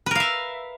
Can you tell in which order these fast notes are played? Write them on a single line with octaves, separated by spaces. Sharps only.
B4 A#4 F5 E5